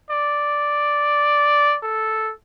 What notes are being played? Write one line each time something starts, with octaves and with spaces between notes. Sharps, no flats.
D5
A4